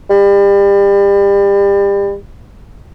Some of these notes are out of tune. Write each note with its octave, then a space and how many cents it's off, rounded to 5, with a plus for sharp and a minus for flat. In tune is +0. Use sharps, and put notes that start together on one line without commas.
G3 +30